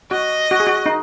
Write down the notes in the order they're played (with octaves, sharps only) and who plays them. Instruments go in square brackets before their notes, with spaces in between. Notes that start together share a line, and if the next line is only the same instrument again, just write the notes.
[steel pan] F#4 [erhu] D#5
[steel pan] F#4
G#4
F#4
D#4